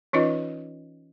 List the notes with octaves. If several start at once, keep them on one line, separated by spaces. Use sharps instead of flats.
E3 C#4 D#4 F4 B4 D#5